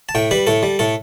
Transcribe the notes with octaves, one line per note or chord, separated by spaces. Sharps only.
A5
A2 G5
G3 B4
A2 A4
G3
A2 A4